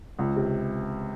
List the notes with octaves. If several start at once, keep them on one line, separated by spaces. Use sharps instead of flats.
C#2
C3